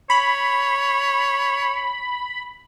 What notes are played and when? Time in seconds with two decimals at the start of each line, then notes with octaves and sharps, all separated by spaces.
0.10 C#5 B5